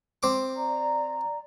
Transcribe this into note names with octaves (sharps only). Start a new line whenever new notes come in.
C4 D6
D5 A#5